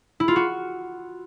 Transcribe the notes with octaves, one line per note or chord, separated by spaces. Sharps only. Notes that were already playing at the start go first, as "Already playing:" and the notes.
E4
F4
F#4